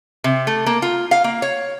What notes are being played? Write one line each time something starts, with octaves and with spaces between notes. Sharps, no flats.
C3
A3
A#3
F4
F5
A#3
C#5